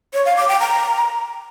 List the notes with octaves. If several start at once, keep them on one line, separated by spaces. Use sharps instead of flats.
C#5
F5
D6
G5
A#5